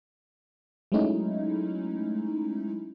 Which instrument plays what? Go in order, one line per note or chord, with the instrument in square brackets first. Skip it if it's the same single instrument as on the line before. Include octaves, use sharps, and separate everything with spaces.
[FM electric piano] F#3 G#3 A3 C#4 D#4 E4